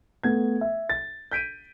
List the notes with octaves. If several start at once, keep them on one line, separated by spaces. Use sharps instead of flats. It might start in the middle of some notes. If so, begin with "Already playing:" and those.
A3 B3 G#6
E5
A6
G6 B6 D7 D#7